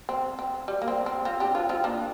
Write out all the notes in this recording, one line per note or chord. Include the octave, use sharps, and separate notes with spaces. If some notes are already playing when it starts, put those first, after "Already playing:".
C4
C4
G3
A#3
C4
C4
C4 F4
D4 G4
C4 F4
C4 F4
A#3 D4